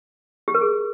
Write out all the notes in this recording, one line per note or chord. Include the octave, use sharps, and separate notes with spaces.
G4
A#4
G#4